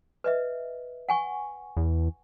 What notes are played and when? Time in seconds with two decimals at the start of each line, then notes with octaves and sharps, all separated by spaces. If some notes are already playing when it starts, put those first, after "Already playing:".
0.24 B4 D#5 E5
1.09 F#5 G#5 C#6
1.77 E2